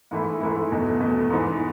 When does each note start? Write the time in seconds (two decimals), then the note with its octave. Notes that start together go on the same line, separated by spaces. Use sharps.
0.11 G#2 E3 A3 E4
0.41 G#2 E3 A3 E4
0.71 E2 B2 A3
1.00 E2 B2 A3
1.30 G#2 E3 B3